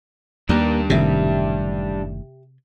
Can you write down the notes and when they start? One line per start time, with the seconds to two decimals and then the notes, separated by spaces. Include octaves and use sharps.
0.49 D#2 G3 A#3 D4 A#4
0.90 F#1 A2 C3 D#3 G4 E5